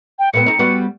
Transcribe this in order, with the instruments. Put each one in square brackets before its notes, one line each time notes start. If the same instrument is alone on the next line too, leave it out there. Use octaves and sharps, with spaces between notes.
[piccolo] G5
[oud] A#2 B3 C4 [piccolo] C#7
[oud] C4 D#4
G3 B3 F#4